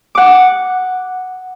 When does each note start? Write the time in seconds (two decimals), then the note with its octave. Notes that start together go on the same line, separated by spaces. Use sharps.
0.15 F#5 D6